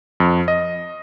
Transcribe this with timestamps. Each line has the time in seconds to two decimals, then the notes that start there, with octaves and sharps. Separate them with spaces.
0.20 F2
0.48 D#5